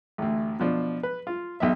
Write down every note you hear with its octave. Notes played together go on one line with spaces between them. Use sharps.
A1 D2
B2 F3 D4
B4
F4
B1 E2 E5